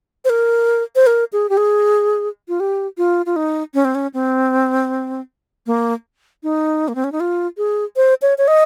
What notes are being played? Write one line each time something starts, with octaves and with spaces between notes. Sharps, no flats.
C5
A#4
C5
A#4
G#4
G4
G#4
F4
G4
F4
F4
D#4
C#4
C4
C#4
C4
A#3
D#4
A#3
C4
C#4
D#4
F4
G#4
C5
C#5
C#5
D#5